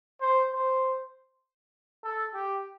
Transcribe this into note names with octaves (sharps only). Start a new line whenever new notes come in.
C5
C5
A4
G4